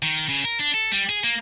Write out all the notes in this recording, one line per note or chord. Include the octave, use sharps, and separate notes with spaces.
D#3
C#3
A#4
D4
A4
G3
G#4
A#3